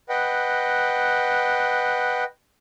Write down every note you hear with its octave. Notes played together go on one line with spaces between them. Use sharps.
B4 D#5 F#5 G5